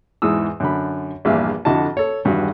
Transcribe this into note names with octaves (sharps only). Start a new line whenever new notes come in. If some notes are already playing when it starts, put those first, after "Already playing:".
E2 G#2 E3 D#6 E6
F#2 D3 B5
A#1 E2 G2 A#2 E5 F5
F2 D3 E4 F#4 D#5 A5
A4 C#5
G#1 E2 G2 F#4 F#5